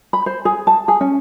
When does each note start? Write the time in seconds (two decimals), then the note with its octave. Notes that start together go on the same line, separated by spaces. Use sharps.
0.13 B5
0.26 C5
0.45 G#4
0.67 A5
0.88 G#4
1.01 C#4